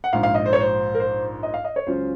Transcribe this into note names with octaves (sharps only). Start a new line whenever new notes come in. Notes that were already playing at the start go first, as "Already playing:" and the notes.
F#5
A#1 G#2 F3 F5
F5
D#5
C5
C#5
C5
A#4
C5
D#5
F5
D#5
C#5
C#2 C#3 F#3 C#4 F4 C5